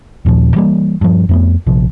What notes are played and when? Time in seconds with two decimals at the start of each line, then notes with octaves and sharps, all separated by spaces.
0.25 A#1 D#2 A#2 F3
0.54 E3 G3 A#3
1.01 G2 F3
1.29 F2 A3 B3
1.67 A#1 C3 F3